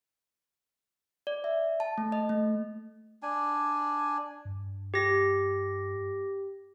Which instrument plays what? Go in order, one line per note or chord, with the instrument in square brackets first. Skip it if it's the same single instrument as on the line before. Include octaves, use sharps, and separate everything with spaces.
[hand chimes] D5
E5
A5
A3
D#5
A3
[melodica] D4 G#5
[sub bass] G2
[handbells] G4 A#6